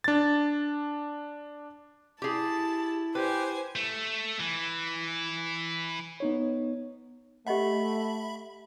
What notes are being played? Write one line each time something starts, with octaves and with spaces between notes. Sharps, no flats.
D4 A6
E4 G4 G#4 A5
G4 B4 C5 G#5
A3
E3
B3 D#4 C#5
A3 G4 D#5 E5 F#5 B5